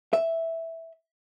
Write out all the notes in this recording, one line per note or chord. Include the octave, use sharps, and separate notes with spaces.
E5